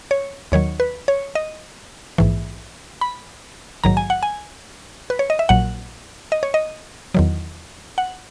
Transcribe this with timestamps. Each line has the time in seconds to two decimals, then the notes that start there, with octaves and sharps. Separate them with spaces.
0.11 C#5
0.52 D#2 D#3 F#3 C#5
0.80 B4
1.08 C#5
1.35 D#5
2.18 A#1 G#2 E3
3.01 B5
3.84 A#1 G#2 D#3 F#3 A#5
3.97 G#5
4.10 F#5
4.23 G#5
5.10 B4
5.19 C#5
5.30 D#5
5.39 E5
5.49 A#1 A#2 F#3 F#5
6.32 D#5
6.43 C#5
6.54 D#5
7.14 E2 D#3 F#3
7.98 F#5